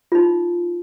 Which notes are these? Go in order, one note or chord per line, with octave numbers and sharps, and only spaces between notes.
D#4 F4